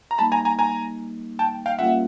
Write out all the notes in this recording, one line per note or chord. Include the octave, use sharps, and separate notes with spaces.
A#5
G3 A#3 D#4 A5 B5
G#5 A#5
G#5 A#5
G#5 A#5
G5 A5
F5 G5
G3 A#3 C#4 F4 E5 F#5